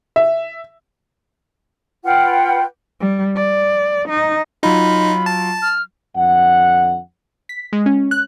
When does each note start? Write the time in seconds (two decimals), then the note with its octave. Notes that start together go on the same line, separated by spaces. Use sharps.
0.16 E5
2.04 F4 B4 F#5 G5
3.00 G3
3.36 D5
4.09 D#4
4.63 F#3 D#4 F4 B5
5.26 A5
5.62 F6
6.16 F2 D3 F#5
7.49 B6
7.73 G#3
7.86 C#4
8.11 F#6